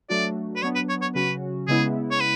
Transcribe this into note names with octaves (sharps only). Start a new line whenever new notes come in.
F#3 A3 D4 F#4 D5
B4
F#3 B3 D4 C#5
B4
C#5
C#5
C#3 F#3 C#4 F#4 B4
C#3 G#3 B3 E4 G#4
C#5
B4